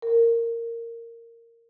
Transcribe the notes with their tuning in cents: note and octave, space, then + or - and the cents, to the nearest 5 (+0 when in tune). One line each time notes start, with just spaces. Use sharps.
A#4 -15